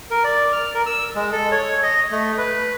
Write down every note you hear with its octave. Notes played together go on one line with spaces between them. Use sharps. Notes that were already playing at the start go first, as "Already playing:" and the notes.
A#4
D5
F6
A#4
E6
G#3
A4
C#5
D#5
A3
B4